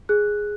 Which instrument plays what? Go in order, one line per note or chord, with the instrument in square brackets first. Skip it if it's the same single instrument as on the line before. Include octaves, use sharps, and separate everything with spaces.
[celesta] G#4 F#6